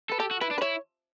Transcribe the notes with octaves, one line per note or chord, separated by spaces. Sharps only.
A4 B4
G4 A4
F#4
E4 B4
D4
B4
E4 C#5